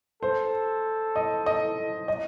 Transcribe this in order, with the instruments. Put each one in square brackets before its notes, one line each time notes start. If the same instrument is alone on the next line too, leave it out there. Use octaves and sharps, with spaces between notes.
[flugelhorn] A4 [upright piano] C5
[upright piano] D#5
D#5
D#5